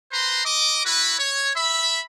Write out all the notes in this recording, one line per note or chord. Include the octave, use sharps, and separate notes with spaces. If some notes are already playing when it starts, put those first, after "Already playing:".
B4 C5 A#5 C6
D#5 D6
E4 F#4 B4
C#5
E5 B5